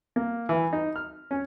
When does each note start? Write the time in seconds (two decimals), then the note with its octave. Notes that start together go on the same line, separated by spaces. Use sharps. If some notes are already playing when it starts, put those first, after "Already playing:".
0.16 A#3
0.49 E3
0.73 D#4
0.96 F6
1.31 C#4